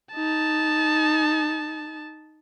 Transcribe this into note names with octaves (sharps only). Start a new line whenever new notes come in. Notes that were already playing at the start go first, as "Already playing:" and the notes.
D#4 A5